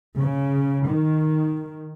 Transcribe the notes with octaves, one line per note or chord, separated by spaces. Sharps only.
C#3
D#3